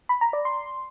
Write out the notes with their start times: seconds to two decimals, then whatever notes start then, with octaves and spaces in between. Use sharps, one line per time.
0.09 B5
0.21 A#5
0.33 D5
0.45 C6